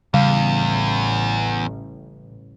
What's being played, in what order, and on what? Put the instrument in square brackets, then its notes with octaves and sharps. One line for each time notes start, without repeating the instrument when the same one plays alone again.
[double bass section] A1 [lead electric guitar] E2 [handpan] C#3 G3 F5